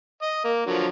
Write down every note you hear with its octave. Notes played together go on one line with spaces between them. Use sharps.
D#5
A#3
D3 F3 F#3